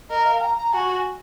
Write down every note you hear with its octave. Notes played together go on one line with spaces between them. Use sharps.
A#4 D#5
F5
A#5
A#5
F#4 G#5